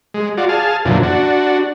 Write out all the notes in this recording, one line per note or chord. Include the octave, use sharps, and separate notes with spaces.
G#3
F4 F#4 D5
G#4 F5 A5
F#2 A#2 D3 E3 F3
D4 F#4